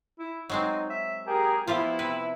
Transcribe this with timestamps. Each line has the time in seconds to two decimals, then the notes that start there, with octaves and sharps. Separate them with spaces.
0.19 E4
0.50 F#3 G#3 C4 D#4
0.90 E5
1.27 G4 G#4 A#4
1.67 F3 B3 E4 F4 G4
1.99 C3 B4